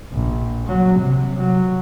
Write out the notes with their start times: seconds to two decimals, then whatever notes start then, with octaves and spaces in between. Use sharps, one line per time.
0.14 A#1
0.67 F#3
1.01 C3
1.37 F#3